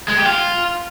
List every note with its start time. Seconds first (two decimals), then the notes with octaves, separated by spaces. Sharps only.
0.08 G#3
0.17 G4
0.26 F4